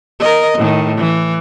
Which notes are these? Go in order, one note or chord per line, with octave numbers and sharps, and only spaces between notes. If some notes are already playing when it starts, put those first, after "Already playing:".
A#4 D#5
A2 D#3
E3